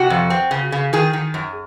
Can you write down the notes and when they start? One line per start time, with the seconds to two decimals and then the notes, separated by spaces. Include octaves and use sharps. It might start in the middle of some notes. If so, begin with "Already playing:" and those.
Already playing: C3 F#4
0.10 F2
0.30 C4
0.51 C#3
0.72 C#3
0.93 D#3 G#4
1.13 D#3
1.34 F#2